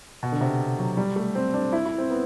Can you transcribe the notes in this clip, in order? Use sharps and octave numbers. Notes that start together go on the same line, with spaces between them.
B2
D3
C3
F#3
G3
A3
C4
D4
E4
E4
C4
B3